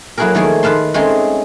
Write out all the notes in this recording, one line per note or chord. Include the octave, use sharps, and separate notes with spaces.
F#3 A#3 E4 F#4 G#4 A#4
D#3 F3 A3 A#3 G#4 C#5
D#3 B4 F5 A5 C6
G#3 A3 C4 C#4 D#4 G#4